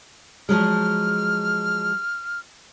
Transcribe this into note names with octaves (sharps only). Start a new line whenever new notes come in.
F3 F#3 G#3 F6